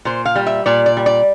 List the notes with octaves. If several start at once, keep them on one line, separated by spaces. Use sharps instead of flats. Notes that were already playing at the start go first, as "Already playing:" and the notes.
A#2 C5
F5
G3
E5
A#2 D5
D5
G3
D5